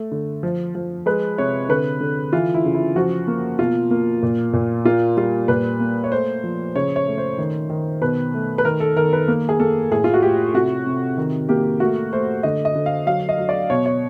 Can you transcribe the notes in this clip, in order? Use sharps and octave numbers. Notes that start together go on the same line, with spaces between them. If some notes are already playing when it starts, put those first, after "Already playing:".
Already playing: A3
D3
F3
F3
G#3 B4
C3 C#5
D3 B4
D3
E3 F4
E4
C#3
E4
F3 F#4
A#3
B2 F4
A#3
A#2
A#2
A#3 F4
G3 F4
A#2 B4
A#3
C#5
A3 C5
F3
C#3 C#5
C#5
A3
C5
D#3
D#3
B2 B4
A3
B4
D#3 A#4
A4
D#3 A#4
B4
A#3
G#4
A#3 A4
A2 G#4
F4
F#4
A3 G4
C3 F#4
C3
D#3
A#3 G4
A3 F#4
A3 C5
D3 D#5
D#5
D3
F5
F#3 F5
D#5
F#3
D5
B2 C#5
C#5